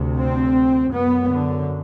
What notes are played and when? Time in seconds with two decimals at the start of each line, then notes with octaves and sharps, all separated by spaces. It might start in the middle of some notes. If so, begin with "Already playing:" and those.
Already playing: D2 C3
0.17 C4
0.92 F#2 B3
1.29 D3